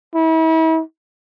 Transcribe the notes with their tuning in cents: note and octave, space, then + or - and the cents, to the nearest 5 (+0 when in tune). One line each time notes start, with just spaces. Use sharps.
E4 -40